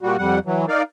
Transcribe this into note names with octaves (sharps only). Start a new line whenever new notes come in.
A#2 G3 F#4
F2 G3 F#5
E3 F#3
D#4 A#4 D5 F5